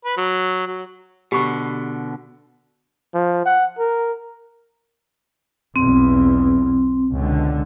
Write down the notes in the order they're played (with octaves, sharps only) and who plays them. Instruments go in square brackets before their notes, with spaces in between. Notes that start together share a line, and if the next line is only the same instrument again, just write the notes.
[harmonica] B4
F#3
F#3
[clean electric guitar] B2 D3 [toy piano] G4 B5 C#6
[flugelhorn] F3
F#5
A#4
[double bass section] B1 E2 [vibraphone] C4
[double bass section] C#2 B2 D3